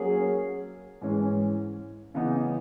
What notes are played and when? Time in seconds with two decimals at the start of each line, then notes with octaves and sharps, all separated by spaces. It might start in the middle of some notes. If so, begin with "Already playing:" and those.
Already playing: F#3 A#3 C#4 G#4
1.01 G#2 E3 G#3 C#4
2.14 C#3 E3 B3 D#4